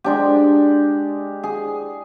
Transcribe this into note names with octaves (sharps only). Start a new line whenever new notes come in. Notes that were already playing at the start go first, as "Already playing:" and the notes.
G#3 D4 G4
G#4